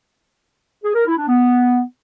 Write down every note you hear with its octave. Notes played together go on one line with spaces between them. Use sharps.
G#4
A#4
E4
D4
B3